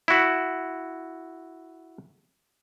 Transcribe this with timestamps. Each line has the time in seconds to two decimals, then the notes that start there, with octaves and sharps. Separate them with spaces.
0.08 E4 F#4